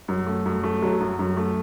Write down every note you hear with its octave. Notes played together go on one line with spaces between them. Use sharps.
F#2
A3
F#2
A3
F#3
F#2
F#2
A3